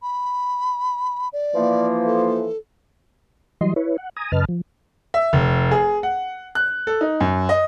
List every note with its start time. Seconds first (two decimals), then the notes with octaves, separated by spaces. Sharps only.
0.02 B5
1.33 D5
1.55 E3 F3 A#3
2.06 A4
3.61 E3 F#3 G3 D#5 C6
3.76 E4 B4 C#5
3.98 F#5
4.16 G#5 A#5 D#6
4.32 F#2 C#3 B4 D#5 A5 F6
4.49 F3
5.14 E5
5.33 F1
5.71 G#4
6.03 F#5
6.55 F#6
6.87 A4
7.01 D#4
7.20 F#2
7.49 D#5